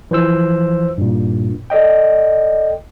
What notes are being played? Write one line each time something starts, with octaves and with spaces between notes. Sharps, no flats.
E3 F3 C5 E6
G2 A#2
A4 D5 D#5 G5